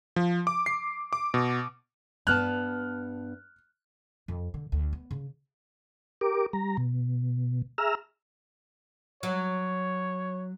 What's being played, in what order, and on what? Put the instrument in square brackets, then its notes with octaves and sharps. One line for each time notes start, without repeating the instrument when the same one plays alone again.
[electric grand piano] F3
D6
C7
D6
B2
[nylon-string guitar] G2 B3 A5 [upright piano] F6 F#6
[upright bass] F2
D3
D2
B3
C#3
[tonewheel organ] G4 A#4 D6
G3 A#5
B2
G#4 E5 A#5 E6 F6
[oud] F#3 [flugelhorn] C#5